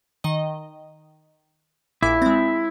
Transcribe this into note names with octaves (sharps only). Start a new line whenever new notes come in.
D#3 D#5
A#1 A#2 E4 D6
G#3 C4